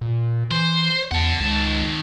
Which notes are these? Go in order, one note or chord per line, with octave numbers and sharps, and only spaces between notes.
A#2
E3 C5
E2 F#5 A5
C#2 D#3 A5